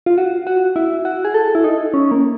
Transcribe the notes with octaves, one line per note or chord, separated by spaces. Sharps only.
F4
F#4
F#4
E4
F#4
G#4
A4
E4
D#4
C#4
A#3